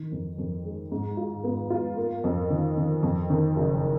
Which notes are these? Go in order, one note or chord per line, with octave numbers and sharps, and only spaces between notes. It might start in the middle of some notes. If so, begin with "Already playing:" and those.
Already playing: D#3
F2
F2
G#3
G#2
F4
B3
F4
A#3
F2
D#3
D#3
F2
D#3
F#1